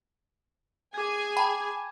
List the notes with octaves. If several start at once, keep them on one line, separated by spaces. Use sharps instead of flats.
G#4 G#5 D6 G#6
G5 A5 B5